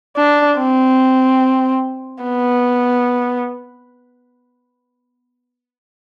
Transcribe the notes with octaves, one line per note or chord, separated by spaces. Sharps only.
D4
C4
B3